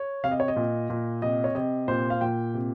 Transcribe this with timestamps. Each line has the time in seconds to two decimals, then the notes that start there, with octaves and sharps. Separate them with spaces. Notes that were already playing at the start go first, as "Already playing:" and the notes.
Already playing: C#5
0.24 C3 F5
0.32 D#5
0.40 C#5
0.48 D#5
0.56 A#2
0.90 A#2
1.22 C3 D#5
1.44 C#5
1.55 C3 D#5
1.88 A#2 C5
2.10 F5
2.21 A#2 G5
2.54 C3